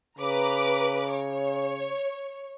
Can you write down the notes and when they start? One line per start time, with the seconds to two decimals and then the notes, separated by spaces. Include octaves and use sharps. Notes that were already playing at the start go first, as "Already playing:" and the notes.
0.19 C#3 B4 A#5 D6
1.08 C#5